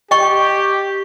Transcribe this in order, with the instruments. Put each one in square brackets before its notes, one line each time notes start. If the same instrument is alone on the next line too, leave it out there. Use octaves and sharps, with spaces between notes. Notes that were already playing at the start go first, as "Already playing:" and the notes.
[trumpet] G4 [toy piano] D#5 G5 C#6